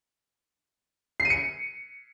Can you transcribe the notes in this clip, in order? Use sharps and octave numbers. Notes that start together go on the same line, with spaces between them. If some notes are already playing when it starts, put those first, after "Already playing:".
C7
D#7
C#7